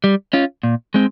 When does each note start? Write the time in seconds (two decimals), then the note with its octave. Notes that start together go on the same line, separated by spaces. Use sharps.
0.04 G3
0.33 C#4 F4
0.63 A#2
0.94 G#3 C4